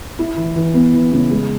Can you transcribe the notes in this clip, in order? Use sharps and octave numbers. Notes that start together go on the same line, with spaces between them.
E4
E3
E3
B3
E3
C#3
G#3